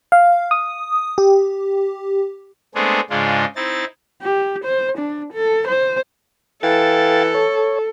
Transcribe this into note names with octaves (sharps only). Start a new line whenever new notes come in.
F5
D#6
G4
G#3 A3 B3 C4 D4 G#4
G#2 C#3 G#3 D4 F4
C4 D#4 E4 A6
G4
C5
D4
A4
C5
E3 A4 F5 G5 A6
C#5